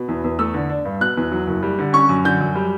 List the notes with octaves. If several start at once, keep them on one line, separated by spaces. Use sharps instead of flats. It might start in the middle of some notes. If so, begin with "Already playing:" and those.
Already playing: B2
E2
E2
A3 E6
D3
D4
G2
B2 F#6
E2
F#3
F#1
G3
D3
C#4 C#6
F#2
D3 G6
F#2
G3